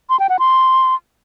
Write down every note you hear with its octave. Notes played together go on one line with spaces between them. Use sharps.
C6
G5
F#5
C6